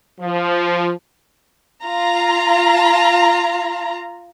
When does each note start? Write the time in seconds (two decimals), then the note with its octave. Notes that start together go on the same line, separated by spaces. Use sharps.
0.20 F3
1.85 F4 A#5